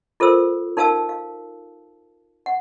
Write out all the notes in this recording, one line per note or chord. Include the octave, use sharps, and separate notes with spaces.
F4 A4 A#4 C5 E6
D#4 A#4 F5 A5 E6
F5
F#5